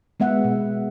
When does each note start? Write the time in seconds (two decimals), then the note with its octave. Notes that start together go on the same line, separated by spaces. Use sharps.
0.20 G#3 B3 E5 F#5
0.44 B2